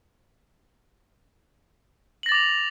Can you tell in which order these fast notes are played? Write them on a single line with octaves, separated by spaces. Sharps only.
F#7 A#6 A6 D6 F7